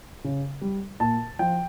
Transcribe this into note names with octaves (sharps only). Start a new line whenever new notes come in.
C#3
G3
A#2 A5
F3 G5